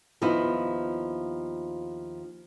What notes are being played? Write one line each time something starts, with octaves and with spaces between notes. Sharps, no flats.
D#2 F3 B3 D#4 E4